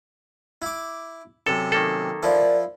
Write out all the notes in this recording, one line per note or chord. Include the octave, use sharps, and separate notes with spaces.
E4 D6
F#2 C3 A4
D#3 A#3 A4
F3 E4 A#4 D5